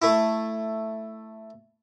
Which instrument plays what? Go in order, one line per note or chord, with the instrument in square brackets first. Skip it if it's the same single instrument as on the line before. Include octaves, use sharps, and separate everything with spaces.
[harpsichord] A3 E4